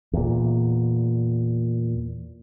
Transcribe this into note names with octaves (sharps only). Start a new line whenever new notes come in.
E2 A#2